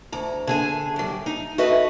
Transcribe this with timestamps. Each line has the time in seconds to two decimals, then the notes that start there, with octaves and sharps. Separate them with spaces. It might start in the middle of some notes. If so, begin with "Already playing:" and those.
0.12 D2 A#5
0.47 D3 G#4 G#5
0.96 F#3 G3
1.26 D#4
1.58 F#4 A4 B4 D#5 E5